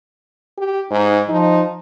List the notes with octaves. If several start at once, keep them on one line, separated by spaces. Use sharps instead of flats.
G4
G#2 D#4
F3 D#4